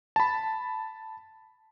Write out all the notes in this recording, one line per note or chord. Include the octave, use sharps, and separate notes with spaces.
A5 B5